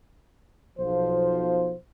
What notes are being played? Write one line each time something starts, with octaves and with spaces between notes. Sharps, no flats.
B1 F3 C5